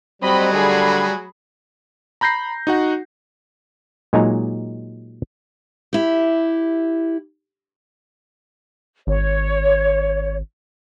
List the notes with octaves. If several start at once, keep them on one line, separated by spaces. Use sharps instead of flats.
F#3 G3 A3 C4 D#5 B5
D3 G#4 B5
A#5 B5 G6 A#6 C7
D#4 F#4 F#5
A#2 F#3 G#3 D#4 G#5 A#5
E4 G4
G#1 C#5